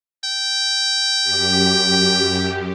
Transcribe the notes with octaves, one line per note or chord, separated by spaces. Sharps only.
G5
F#2 G4